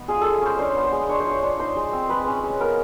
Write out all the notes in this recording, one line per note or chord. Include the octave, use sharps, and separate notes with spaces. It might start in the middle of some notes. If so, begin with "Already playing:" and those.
Already playing: B3 D#4
F4 G#4
G#3 A4
C#4 C5
D4 C5
B3
C5
G#3
D4 C#5
C5
F4 C#5
D4
D#4 C5
G#3
C4
G#3 B4
C#4
G#3
B3 A#4